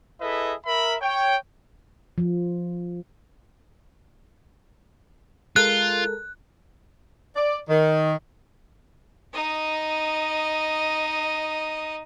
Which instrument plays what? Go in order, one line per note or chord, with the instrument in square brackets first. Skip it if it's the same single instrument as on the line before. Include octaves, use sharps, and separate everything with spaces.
[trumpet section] E4 G#4 A4 B4 D#5 E5
A#4 E5 B5
C#5 G5
[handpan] F3
[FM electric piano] G#3 A4 A#4 [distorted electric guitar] F4 [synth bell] F#6
[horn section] D5
D#3
[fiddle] D#4 D#5